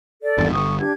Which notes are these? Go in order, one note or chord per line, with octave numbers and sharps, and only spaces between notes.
A4 D5
G#1 E2 G2
G1 C#6 D#6
D4 G4 G#6